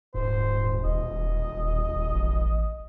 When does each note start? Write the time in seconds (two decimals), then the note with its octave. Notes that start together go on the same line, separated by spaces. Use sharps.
0.14 D#1 G#2 C5
0.84 E1 D#5
2.10 A1